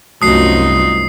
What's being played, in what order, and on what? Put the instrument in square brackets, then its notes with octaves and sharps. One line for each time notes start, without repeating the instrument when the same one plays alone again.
[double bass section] C2 [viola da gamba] F#2 D#4 F4 [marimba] A3 F#4 [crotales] D#6 C7